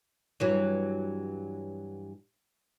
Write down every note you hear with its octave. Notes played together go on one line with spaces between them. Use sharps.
G2 E3 F#3